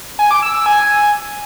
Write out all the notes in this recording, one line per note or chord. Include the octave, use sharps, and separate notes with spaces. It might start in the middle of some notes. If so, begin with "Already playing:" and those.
G#5
D6
E6
E6
G#5